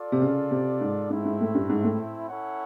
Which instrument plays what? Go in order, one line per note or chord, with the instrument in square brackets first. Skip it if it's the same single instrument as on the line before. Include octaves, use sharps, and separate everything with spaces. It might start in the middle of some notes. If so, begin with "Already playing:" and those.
Already playing: [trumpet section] F4 A4 D5
[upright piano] C3
C#3
C3
G#2
[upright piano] G#2 [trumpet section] A3 C4 E4
[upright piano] G#2
A2
G2
G#2
A2
[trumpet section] C#4 E4 A4 C#5 F#5